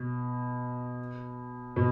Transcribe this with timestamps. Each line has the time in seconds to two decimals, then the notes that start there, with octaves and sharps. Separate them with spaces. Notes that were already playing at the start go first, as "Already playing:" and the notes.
Already playing: B2
1.76 B2